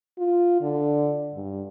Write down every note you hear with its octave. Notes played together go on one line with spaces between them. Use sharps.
F4
D3
G2